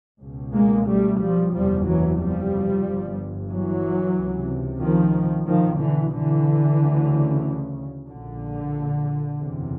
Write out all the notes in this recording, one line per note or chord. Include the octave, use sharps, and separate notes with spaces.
C#2 B2
G#3 A#3
G3 A3
F3 G3
F#1 E2 C3 F3 G3
E3 F#3
F3 G3
G1 G2
E3 F#3
C#2 C3
D#3 F3
B1 B2 D#3 F3
D3 E3
D3 E3
D2 C#3
A#1 A#2 D3
F#1 E2 C3